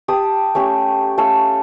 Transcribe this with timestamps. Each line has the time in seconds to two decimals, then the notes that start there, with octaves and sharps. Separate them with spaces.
0.08 G4 A5 D#6
0.55 A3 C#4 G4
1.18 A3 C#4 A4 F5